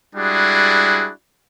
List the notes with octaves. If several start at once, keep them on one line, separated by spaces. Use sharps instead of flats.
G3 G#3 D4 E4 F#4 G#4